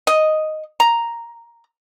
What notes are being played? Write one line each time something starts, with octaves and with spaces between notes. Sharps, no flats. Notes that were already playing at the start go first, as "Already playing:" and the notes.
D#5
A#5